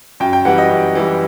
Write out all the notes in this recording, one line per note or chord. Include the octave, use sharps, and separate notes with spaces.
F#2 G5
G5
E3 G3 F#5
D#5
F#2
E3 G3